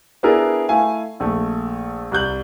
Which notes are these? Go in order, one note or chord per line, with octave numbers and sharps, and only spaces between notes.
B3 D4 E4 G#4 A#4
A3 E4 F5 G#5
A#1 A3
C2 F#6 G6 F#7